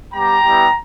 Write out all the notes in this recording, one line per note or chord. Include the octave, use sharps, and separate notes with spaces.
G3 B3 G4 G5 A#5
G3 B3 E4 G4